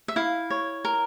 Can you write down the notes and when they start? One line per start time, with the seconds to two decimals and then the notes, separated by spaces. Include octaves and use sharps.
0.08 E5
0.16 E4 F5
0.50 C#5
0.85 A#4